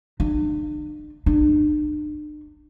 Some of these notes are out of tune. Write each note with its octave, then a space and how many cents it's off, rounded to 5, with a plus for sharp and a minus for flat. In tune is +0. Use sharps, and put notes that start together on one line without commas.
D4 +45
D4 +45